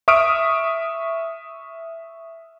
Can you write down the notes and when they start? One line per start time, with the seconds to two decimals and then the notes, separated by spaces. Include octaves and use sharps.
0.08 E5 C#6 D#6 F6 D7